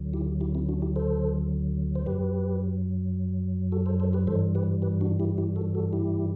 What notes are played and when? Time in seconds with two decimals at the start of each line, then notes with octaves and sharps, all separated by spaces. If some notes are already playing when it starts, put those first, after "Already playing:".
Already playing: D2 D3 F#3
0.13 E4 G4
0.41 E4 G4
0.55 C4 E4
0.69 D4 F#4
0.82 E4 G4
0.96 A4 C5
1.95 C5
2.06 F#2 F#3 G4 B4
3.72 F#4 A4
3.86 A4 C5
4.00 A4 C5
4.13 G4 B4
4.27 G2 E3 G3 A4 C5
4.55 G4 B4
4.82 G4 B4
5.01 D4 F#4
5.19 E4 G4
5.38 E4 G4
5.56 F#4 A4
5.75 F#4 A4
5.93 E4 G4